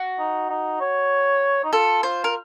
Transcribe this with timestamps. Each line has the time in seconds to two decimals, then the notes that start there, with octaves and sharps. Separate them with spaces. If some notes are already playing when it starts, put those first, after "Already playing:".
Already playing: F#4
0.19 D#4
0.50 D#4
0.80 C#5
1.64 D#4
1.73 F4 A4
2.03 F4 C5
2.24 A#4